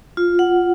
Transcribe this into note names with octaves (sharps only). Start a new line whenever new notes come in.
F4
F#5